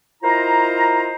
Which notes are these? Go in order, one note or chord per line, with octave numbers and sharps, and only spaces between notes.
E4 F4 A#4 C5 D#5 A#5